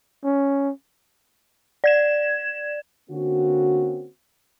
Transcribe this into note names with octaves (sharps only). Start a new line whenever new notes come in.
C#4
D5 G#6 E7
D3 A#3 C4 C#4 F#4